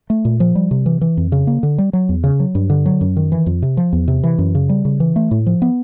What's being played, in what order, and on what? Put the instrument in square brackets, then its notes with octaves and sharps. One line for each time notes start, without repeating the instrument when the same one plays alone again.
[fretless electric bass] A3
A#2
F3
G3
C3
E3
E3
F2
C#3
A#3
D3
G3
F#3
E2
C#3
F#3
G2
D3
F#3
F#2
D#3
E3
F2
C3
F3
E2
C3
E3
F#2
C#3
G3
C#3
E3
A3
A2
F3
B3